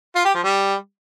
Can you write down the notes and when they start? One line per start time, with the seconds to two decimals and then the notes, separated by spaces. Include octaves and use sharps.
0.15 F4
0.25 G4
0.34 F3
0.44 G3